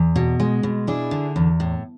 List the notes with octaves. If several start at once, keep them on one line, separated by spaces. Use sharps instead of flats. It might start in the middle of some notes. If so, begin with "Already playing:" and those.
Already playing: E2
B2
G#3
B2
D4 E4 G#4
D3
E2
A2